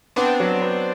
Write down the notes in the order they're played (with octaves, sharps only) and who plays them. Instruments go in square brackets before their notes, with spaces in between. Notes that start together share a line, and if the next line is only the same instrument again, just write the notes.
[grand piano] B3 [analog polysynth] C4 D4
[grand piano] F#3
B3